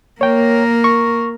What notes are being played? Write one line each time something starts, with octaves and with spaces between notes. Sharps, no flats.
A#3 A#4 C#5 G5
C#6